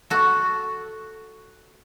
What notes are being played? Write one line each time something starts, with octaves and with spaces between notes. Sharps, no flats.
F#4 A4